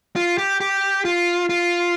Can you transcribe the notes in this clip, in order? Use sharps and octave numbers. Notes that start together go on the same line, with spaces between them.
F4
G4
G4
F4
F4